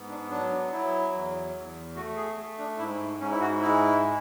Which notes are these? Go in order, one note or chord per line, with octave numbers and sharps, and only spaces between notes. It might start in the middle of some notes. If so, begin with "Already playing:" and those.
Already playing: G#2 B3
D4
F#3 D4
F#3 E4
E2
E2
A3 F#4
G#4
A3
D4
G#2 E4
G#2 C#4
E4
F#4
G#3 E4
G#3